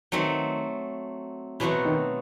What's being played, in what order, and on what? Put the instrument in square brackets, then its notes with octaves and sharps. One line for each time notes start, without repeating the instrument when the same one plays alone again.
[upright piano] D#3 [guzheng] F#3 A3 C4
[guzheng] B2 F#3 A3 C4 F#4 [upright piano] E3
[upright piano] D#3